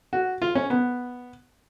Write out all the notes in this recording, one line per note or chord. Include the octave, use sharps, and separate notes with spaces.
F#4
F4
C#4
B3